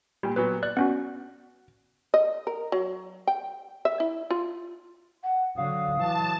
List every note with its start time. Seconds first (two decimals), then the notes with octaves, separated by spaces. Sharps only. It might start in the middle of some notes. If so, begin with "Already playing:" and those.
0.23 A#2 G3 G4
0.36 A#2 F#3 B3 B4
0.63 D5 F#6
0.77 B3 C#4 F#4
2.14 D#5
2.47 A#4
2.72 F#3
3.27 G5
3.85 E5
4.00 E4
4.30 F4
5.24 F#5
5.57 D3 F#3 F5 D#6
5.98 E3 F#3 A5